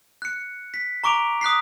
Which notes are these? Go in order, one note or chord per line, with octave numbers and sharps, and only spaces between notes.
F#6 C#7
B6
A#5 C#6 D6 D7 F7
D#6 F#6 B6 C7